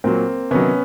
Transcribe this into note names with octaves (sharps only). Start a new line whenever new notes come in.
A#2 F#3 A#3 C4
C3 D#3 F#3 B3 C#4